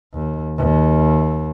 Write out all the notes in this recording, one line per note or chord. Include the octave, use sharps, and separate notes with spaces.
D#2
D#2